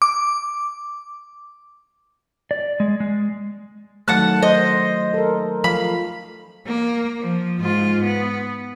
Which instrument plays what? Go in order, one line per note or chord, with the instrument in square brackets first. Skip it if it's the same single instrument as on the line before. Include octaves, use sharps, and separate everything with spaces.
[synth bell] D6
[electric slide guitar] D5
G#3
G#3
[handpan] D#3 F#3 A3 [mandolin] F#5 A5 F#6
[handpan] C5 [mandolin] D#5
[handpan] A4 A#4
[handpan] F3 F5 [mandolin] B5
[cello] A#3
F3
G#2 F4
B3